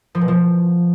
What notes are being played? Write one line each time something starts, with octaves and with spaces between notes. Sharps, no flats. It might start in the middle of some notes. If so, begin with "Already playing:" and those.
F3
B2
F3